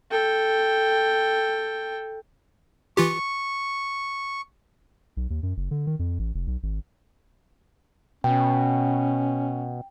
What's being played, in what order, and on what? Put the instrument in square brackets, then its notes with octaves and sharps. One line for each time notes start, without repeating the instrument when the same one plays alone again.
[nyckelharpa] A4 G5
[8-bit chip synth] E3 F4 G4 [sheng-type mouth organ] C#6
[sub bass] B1
D#2
F#2
F#1
D3
D#3
F2
A1
F1
B1
G#1
[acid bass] B2 [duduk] C#4 [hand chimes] G5